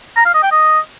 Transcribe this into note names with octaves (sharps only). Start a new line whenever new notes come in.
A#5
F5
D#5
G5
D#5